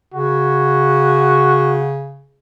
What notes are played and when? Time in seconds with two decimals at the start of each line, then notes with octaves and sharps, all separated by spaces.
0.14 C#3 F#4